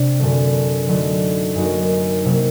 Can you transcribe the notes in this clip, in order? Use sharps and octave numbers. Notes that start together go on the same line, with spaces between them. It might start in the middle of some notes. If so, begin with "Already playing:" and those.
Already playing: C3 D4
F#2 D3 F#3 A3
D3 F#3 A3 D#4 F#4
F#2 F#3 A#3 D#4 F#4
C3 F#3 A#3 D#4